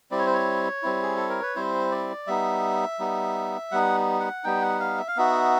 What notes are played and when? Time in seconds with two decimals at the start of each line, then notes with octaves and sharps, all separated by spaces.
0.11 G3 C4 E4 D5
0.18 C#5
0.27 C5
0.34 C#5
0.83 G3 C4 E4
1.02 G#4
1.16 A4
1.29 A#4
1.42 B4
1.55 G3 C4 E4 C5
1.91 D5
2.27 G3 B3 D#4 E5
2.99 G3 B3 D#4
3.71 G3 B3 D#4 F#5
4.20 F#5
4.44 G3 B3 D#4 G5
4.62 F#5
4.80 F5
4.98 E5
5.08 F5
5.16 B3 D#4 F#4 E5